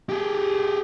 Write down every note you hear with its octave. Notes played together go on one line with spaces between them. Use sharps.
G4 G#4